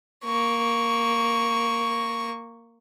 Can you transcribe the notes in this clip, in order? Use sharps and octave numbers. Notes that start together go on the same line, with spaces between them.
A#3 C#6